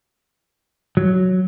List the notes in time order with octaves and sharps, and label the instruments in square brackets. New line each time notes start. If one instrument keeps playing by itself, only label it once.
[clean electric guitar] F#3